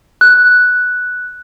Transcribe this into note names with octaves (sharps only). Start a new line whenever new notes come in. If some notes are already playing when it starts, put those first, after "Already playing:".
F#6